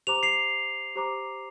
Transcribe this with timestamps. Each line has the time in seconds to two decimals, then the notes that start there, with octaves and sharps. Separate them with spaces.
0.07 G4 C5 A#5 D6 F7
0.23 C7 F7
0.95 G4 C5 A#5 D6